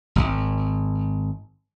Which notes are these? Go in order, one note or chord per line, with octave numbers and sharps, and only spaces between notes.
D#1 G#1